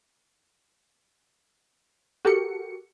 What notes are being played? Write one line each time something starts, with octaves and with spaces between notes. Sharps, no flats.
F#4 G4 A4 A#4 C#7